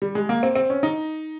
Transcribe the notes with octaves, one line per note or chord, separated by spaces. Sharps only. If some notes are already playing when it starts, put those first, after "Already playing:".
G3
G#3
A#3
C4
C4
C#4
D#4